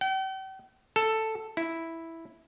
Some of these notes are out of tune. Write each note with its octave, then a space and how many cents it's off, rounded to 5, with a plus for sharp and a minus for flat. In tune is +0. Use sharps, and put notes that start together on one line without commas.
G5 -40
A4 +5
E4 -5